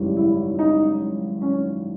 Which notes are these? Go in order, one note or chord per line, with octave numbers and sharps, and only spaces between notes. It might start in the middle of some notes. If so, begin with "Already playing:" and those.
Already playing: G#1 F#2 C#3 E3 G3
E4
E4
D#4
C#4